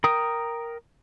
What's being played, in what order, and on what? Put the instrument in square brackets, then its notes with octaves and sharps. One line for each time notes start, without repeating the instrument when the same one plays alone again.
[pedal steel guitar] A#4 G5 D#6